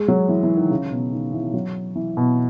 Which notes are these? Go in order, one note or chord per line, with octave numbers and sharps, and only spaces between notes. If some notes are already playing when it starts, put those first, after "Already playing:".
Already playing: G#3
F#3
E3
E3
D#3
C#3
B2
D#3
E3
F#3
E3
B2